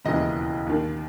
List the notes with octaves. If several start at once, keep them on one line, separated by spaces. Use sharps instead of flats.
E1 D#2 C#3 E3 D#5
D#2 D#3